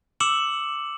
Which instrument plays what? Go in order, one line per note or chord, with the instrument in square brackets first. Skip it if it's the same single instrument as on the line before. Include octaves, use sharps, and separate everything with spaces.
[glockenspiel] D6 E6 C#7 E7 F#7